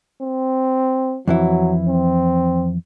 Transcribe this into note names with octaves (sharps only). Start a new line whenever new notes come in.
C4
F2 E3 F#3 E4
C4